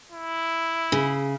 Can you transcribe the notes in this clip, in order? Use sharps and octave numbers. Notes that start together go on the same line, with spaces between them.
E4
C#3